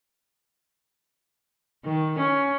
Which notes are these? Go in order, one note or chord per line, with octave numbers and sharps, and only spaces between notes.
D#3
C#4